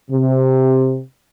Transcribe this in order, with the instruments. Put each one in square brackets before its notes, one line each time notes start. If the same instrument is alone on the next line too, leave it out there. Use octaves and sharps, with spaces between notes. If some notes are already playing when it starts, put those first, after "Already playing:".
[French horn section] C3